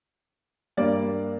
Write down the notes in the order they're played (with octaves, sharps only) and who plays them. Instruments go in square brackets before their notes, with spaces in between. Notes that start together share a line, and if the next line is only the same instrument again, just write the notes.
[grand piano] G2 G3 A#3 D5